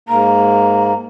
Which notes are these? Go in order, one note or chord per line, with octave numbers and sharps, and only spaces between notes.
G#2 A#3 A#5